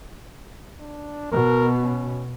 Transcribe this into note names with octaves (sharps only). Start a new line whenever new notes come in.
D4
B2 A#4
C#4